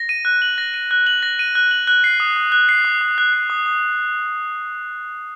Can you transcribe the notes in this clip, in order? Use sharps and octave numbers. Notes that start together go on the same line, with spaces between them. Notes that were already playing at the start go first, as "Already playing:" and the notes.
Already playing: A#6
D#7
F#6
F#7
A#6
D#7
F#6
F#7
A#6
D#7
F#6
F#7
F#6
C7
D#6
D#6
F#6
C7
D#6
D#6
F#6
C7
D#6
D#6